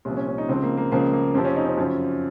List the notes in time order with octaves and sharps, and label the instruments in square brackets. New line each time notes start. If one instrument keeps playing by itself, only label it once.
[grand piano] C2 A#2 F3 C#4
C#4
C#4
D#4
C#2 C#3 F3 C4
A#3
A#3
C#2 C#3 F3 A#3
A#3
F2 C3 F3 C4
C#4
D#4
C#4
F#2 C#3 F3